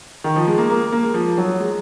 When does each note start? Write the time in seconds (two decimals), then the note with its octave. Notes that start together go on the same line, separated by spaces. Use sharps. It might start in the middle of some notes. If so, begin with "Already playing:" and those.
0.24 D#3
0.36 F3
0.48 G#3
0.58 A#3
0.70 A#3
0.92 A#3
1.03 G#3
1.14 F3
1.38 F#3
1.60 G#3